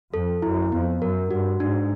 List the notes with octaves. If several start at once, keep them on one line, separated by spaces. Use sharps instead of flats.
F2 A4
F#2 E4
F2 B3
F#2 A#4
G2 F#4
G#2 D4